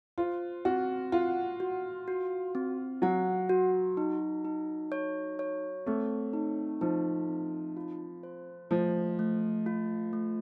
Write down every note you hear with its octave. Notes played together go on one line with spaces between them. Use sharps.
F4 C5
C4 F#4
F4 F#5
F#4
F#4
C4
F#3 F#5
F#4
D#4
D#4
C#5
C#5
A3 C4
D#4
F3 D#4
C4
F4
C5
F3 A3
A3
F4
A3